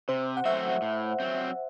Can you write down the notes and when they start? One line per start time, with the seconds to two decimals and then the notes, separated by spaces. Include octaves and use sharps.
0.09 C3 C5
0.37 F#5
0.45 F#3 A3 C4 F#4 E5
0.82 A2
1.20 F#3 C4